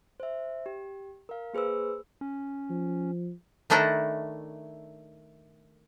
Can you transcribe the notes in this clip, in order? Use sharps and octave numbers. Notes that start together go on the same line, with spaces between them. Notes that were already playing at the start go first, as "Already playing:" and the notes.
C5 E5
G4
A#4 F5
A#3 G#4 B4 C5 E6
C#4
F3
D#3 A3 D4 E4 A4 A#5